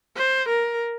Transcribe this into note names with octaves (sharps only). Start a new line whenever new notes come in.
C5
A#4